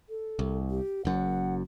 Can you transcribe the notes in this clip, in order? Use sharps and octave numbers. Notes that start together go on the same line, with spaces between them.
A4
C2
G4
F#1 F#2 F#5